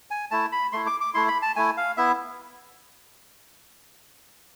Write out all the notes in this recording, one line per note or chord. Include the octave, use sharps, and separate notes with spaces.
G#5
A3 E4 A5
B5
A3 E4 C6
D6
D6
A3 E4 C6
B5
A5
A3 E4 G#5
F5
B3 E4 E5